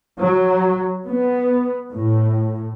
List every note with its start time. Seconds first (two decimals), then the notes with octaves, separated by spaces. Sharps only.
0.18 F#3
1.08 B3
1.92 A2